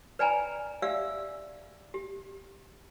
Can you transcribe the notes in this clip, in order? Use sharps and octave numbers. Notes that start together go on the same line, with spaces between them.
B4 D5 G5 G#5 A#5 B5
G4 D5 E5 F5 E6
G4